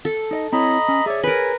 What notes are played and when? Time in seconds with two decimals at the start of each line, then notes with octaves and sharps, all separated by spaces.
0.05 A4
0.31 D#4 D5 D#5
0.53 C4 E4 C#5 D#5 A#5 B5
0.88 C#4
1.06 G#4 C#5 D5 E5
1.23 A#4 B4 G#5